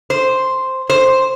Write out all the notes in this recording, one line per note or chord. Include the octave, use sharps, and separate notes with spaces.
C5
C5